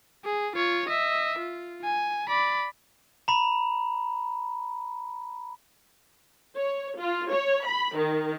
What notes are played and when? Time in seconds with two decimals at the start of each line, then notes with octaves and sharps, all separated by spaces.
0.25 G#4
0.56 F4 C#5
0.89 D#5 E5
1.39 F4
1.84 G#5
2.29 D5 B5
3.28 A#5 B5
6.58 C#5
6.99 F4
7.31 C#5
7.65 B5
7.97 D#3